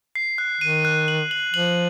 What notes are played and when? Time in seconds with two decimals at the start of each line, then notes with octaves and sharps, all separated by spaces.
0.15 C7
0.38 F#6
0.61 D#3 D#7
0.85 F#6
1.08 F#7
1.31 F#7
1.54 F3 F#7